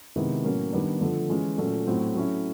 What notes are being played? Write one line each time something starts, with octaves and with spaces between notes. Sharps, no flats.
C3 D#3 G#3 B3 E4
A2 F#3 A#3 C#4
D#3 G3 B3 D4
D3 F3 A3
E3 G#3 C#4
A#2 F#3 A3 C#4
A2 F#3 A3 C4
F#3 A3 C#4 E4